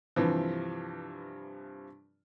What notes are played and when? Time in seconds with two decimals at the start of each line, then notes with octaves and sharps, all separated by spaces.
0.16 G2 C3 E3 F3